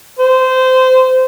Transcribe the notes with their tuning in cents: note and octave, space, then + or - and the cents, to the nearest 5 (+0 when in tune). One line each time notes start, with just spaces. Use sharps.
C5 -20